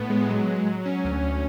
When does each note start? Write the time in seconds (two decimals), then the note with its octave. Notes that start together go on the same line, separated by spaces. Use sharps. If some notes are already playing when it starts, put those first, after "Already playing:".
Already playing: A2 B3
0.10 G#3
0.29 F#3
0.47 F#3
0.66 F#3
0.85 C#4
1.04 D2
1.23 D2